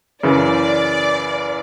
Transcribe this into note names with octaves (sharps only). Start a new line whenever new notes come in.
F#2 C#3 E3 D5